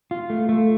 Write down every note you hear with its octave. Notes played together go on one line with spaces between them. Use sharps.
F4
A3
A3